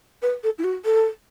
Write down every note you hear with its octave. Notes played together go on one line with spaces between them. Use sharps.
B4
A4
E4
F#4
A4